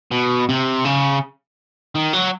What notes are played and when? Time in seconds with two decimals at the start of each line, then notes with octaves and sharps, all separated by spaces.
0.11 B2
0.49 C3
0.85 C#3
1.95 D#3
2.13 F#3